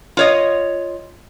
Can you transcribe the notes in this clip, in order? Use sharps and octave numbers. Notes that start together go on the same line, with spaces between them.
F4 C#5 D#5